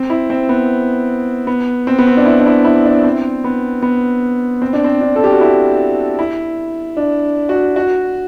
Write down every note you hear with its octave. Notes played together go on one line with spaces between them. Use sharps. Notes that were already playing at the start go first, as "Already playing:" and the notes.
Already playing: C4
E4
C4
B3
B3
C4
B3
C4
D4
E4
D4
E4
E4
D4
C4
B3
B3
C4
D4
C4
D4
A4
G4
F#4
E4
E4
D4
F#4
F#4